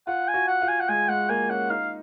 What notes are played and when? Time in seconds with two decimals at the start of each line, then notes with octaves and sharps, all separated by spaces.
0.07 F4 F#5
0.28 G#5
0.34 F#4
0.48 F#5
0.62 F4
0.68 G#5
0.80 F#5
0.89 G#3 G#5
1.09 G#3 F#5
1.29 A#3 G#5
1.50 C#4 F#5
1.70 D#4 F5